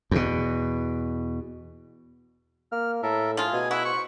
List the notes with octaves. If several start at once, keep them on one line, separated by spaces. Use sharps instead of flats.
E2 B2
A#3 F6
A2 A4 A#4 E5
F3 F4 G#4
B2 G#5
E4 F#4
C5 C#6